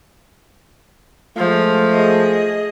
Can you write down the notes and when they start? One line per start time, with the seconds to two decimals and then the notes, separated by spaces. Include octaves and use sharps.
1.37 F3 G#3 A3
1.92 G#4 D#5